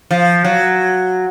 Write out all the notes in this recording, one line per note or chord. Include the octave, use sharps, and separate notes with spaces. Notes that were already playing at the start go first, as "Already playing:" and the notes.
F3
F#3